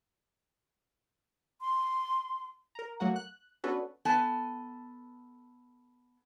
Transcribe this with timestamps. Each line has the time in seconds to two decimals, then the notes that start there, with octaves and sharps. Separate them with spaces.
1.61 C6
2.75 A#4 A#5
3.00 F#3 A3 A#3 F#4 F#5
3.16 F#6
3.64 B3 C#4 D4 F#4 A4 B4
4.05 B3 A4 G#5 A5